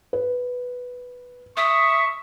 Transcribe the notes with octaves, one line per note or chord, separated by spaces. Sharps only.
B4
E5 C#6 D#6